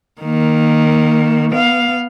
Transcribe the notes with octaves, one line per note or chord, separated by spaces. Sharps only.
D#3 A#3
B3 F5